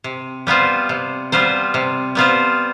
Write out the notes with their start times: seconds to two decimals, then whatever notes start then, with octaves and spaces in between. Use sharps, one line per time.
0.04 C3
0.47 G3 B3 F4 C5
0.89 C3
1.32 G3 B3 F4 C5
1.74 C3
2.15 G3 B3 F4 C5